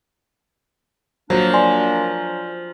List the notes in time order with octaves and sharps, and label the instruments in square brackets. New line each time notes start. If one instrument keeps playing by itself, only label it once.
[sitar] F3 [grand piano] F#3 [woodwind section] A#3 D4
[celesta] D5 G#5 C6